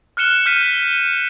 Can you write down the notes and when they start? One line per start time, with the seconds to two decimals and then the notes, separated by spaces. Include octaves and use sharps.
0.17 F6 F#6 C#7 E7 G7
0.46 F6 G6 B6 D#7